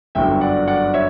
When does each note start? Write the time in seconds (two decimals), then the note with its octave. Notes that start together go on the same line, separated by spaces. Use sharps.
0.15 G1 F#2 D3 F#3 E5 G5
0.41 D5 F#5
0.68 D5 F#5
0.94 C#5 E5